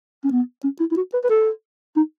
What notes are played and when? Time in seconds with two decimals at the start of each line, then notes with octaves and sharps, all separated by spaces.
0.24 C#4
0.31 B3
0.64 C#4
0.80 E4
0.92 E4
0.97 F#4
1.14 B4
1.24 B4
1.30 A4
1.97 D#4